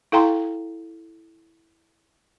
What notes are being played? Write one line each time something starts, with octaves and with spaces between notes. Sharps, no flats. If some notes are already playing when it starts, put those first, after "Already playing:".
E4 A4 F5 G5 A#5 C6